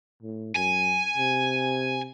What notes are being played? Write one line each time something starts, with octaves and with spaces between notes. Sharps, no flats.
A2
F#2 G#5
C3